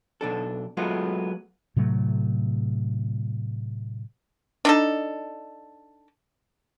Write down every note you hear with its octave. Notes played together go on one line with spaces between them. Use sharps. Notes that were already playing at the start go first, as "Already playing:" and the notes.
B1 D4 A4
F#3 G#3 A3 B3 F4
A2 C3 F#3 A3
D4 D#4 A4